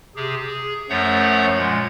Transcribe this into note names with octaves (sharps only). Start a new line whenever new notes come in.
C3 G4 G#4
G#4
F#2 F3 A3 C#5 F#5 G6
A#2 G#3 G#6